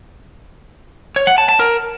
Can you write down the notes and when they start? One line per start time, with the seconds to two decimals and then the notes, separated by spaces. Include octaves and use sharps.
1.16 C#5
1.27 F#5
1.38 A5
1.49 A5
1.60 A#4